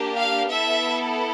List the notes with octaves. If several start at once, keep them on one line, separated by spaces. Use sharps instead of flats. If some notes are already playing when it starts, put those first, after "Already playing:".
Already playing: A#3 D4 G4
F5
B3 E4 A4 E5